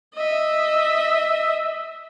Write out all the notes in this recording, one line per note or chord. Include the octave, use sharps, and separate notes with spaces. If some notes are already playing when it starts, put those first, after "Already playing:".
D#5 E5